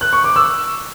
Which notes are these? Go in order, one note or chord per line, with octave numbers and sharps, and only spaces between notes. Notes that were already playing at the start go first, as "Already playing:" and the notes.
F#6
C#6
D6
E6